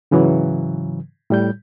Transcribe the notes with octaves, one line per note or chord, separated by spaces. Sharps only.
G#2 C#3 E3 F#3
A2 G3 G6